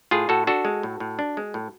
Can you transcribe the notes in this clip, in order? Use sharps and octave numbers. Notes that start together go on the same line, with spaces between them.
A2 F4 G#4
A2 F#4 A4
D4 F#4 A4
G#3
A2
A2
D4
G#3
A2